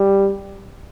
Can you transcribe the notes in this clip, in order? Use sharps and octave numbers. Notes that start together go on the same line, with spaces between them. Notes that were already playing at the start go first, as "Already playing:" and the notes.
Already playing: G3